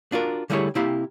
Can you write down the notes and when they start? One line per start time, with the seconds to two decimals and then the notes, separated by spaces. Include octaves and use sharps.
0.12 D4 F4 F#4 A#4
0.50 D3 G3 A3 E4 G#4 C#5
0.75 C3 A#3 E4 G4 F5 B5